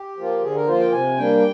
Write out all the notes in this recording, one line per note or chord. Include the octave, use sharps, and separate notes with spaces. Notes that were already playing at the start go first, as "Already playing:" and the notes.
Already playing: G4
F3 A#3 F4
D3 G#4
A#4
F3 A#3 F4 C5
G5
C3 G#5
G3 A#3 D4 G5